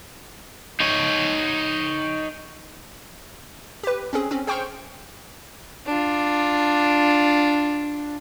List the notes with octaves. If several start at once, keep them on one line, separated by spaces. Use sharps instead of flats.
D#4 C#5
G4 B4
C4 C#4 G#4
C4 C#4
G#4 C5 G5 C#6 F6 G6
D4 F4